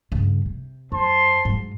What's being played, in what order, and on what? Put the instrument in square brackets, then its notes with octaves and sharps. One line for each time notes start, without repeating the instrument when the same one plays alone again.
[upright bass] G2 C#3
C3
[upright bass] F#2 [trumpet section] C5 A5 C6
[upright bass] G#2 F#3